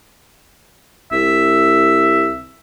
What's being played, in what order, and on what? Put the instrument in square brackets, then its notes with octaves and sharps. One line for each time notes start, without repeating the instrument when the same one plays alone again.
[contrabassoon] C2 [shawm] E5